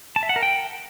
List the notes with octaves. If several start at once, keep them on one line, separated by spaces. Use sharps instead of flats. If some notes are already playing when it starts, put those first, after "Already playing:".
A5
E5
F#5
A#4
G5